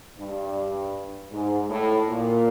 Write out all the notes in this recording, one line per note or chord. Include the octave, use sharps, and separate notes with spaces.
G2
G#2
A2
A#2